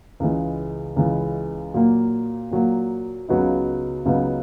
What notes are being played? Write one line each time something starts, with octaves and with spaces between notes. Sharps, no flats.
C#2 C#3 E3 G#3
C#2 C#3 E3 G#3
A#2 F#3 A#3
A#2 F#3 A#3
C#2 C#3 F#3 B3 D#4
C#2 C#3 F#3 B3 D#4